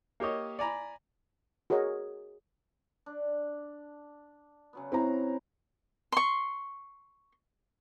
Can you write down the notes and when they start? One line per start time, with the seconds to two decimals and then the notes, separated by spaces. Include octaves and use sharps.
0.20 A#3 G4 C#5 D#5
0.59 D5 G#5 A#5 B5
1.70 F#4 G#4 A#4 C#5 D#5
3.06 D4
4.73 C#3 F#3 B3
4.92 C4 E4 A#5
6.12 C6 C#6